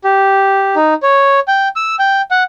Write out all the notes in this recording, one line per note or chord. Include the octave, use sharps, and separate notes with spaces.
G4
D#4
C#5
G5
E6
G5
F#5